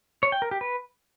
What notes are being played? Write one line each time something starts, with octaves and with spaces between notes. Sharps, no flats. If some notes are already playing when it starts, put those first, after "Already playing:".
C#5
G5
A#4
G4
B4